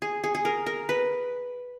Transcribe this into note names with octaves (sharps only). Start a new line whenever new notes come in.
G#4
G#4
G#4
A#4
A#4
B4